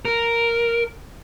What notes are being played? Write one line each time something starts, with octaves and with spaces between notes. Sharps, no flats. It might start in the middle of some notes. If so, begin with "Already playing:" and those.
A#4